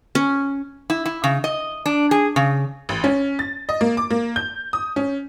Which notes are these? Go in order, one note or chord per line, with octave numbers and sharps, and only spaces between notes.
C#4
E4
E4
C#3
D#5
D4
G#4
C#3
A1
C#4
A6
D#5
A#3
D6
A#3
G6
D#6
C#4